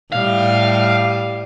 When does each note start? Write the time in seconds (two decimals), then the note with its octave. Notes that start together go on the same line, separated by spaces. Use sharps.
0.12 A2 G3 F5